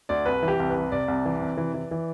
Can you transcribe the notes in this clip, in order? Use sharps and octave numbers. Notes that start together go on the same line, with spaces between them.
D2 D5
C2 B4
E3
G4
C2
B4
C3
C3 D5
C2
E3
C3
E3
E3
E3